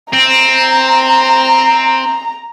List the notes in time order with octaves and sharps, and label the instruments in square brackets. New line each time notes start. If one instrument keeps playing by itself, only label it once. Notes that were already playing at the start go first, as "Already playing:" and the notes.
[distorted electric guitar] C4 [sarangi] A#5